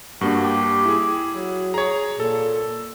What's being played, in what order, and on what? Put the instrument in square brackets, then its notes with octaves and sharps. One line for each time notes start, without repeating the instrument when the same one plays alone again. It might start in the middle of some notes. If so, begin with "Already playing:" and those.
[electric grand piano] G2 A#3 D4 [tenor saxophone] F#4
[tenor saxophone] G4
[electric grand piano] E4 G#4
[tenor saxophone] F#3
[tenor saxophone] G#4 [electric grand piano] C#5 A#5
[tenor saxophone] A#2 [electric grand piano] A4